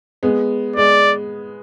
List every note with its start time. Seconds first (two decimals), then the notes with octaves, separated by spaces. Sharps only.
0.23 G#3 B3
0.76 G#3 D5